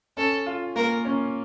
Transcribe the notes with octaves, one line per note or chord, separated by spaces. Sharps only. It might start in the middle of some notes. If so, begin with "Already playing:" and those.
C#4 A4
F4
A#3 A#4
C#4